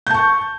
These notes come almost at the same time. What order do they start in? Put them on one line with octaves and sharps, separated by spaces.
G6 A5 C#6